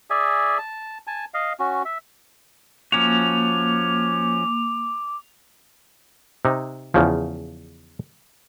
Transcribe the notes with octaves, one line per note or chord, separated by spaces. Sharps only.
G#4 D5 E5 G#5
A5
G#5 A5
D#5 F5
C#4 F#4
E5
F3 A#3 C#4 F#4 D6 F7
C3 D#4
E2 C#3 F3